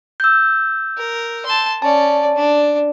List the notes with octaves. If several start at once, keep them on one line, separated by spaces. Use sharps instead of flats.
E6 G6
A#4
A5 C6
C#4 D5 A5
D4